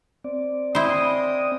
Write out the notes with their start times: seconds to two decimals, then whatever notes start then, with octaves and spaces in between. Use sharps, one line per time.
0.24 C4 D5
0.75 G#3 E4 C5 G5 D#6